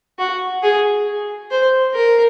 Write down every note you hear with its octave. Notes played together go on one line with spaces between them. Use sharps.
F#4
G#4
C5
A#4